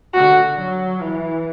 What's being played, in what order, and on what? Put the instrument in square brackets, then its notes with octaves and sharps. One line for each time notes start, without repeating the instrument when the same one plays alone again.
[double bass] D3 [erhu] F#4
[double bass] F#3
E3